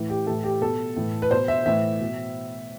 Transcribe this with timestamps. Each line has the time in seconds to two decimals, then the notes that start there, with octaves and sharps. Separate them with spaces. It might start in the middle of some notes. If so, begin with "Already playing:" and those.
Already playing: A2 E3
0.10 G4
0.26 A2 E3 A4
0.44 G4
0.61 B2 A4
0.96 A2 E3
1.22 B4
1.31 B2 C5
1.48 E5
1.66 A2 E3 E5
2.00 B2